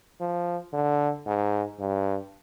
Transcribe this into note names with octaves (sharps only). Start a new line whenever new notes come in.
F3
D3
G#2
G2